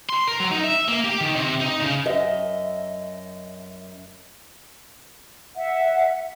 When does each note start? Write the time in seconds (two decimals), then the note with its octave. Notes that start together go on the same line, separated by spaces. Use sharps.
0.09 C6
0.28 A#4
0.40 F#3
0.51 D#4
0.64 E5
0.88 A#3
1.04 G4
1.21 D#3
1.36 C3
1.61 D#4
1.82 C#3
2.06 F#2 D#5 E5
5.55 E5 F#5